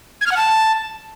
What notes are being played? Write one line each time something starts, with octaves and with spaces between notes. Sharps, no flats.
G#6
F6
F#5
A5